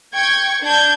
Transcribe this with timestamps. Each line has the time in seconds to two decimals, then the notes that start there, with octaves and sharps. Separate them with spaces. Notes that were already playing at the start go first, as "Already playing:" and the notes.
0.12 G5 C#6 G#6
0.62 D4 G6 G#6